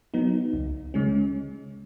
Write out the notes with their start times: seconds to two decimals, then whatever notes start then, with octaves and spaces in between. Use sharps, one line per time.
0.14 F#3 B3 D#4
0.53 C#2
0.94 C#3 G#3 C#4